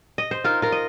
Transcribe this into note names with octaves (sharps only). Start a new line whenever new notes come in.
D#5
C5
D#4 F4 A#4
F4 A#4
D#5